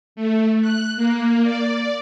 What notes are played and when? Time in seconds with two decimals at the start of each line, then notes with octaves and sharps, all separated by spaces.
0.16 A3
0.62 F#6
0.96 A#3
1.44 D5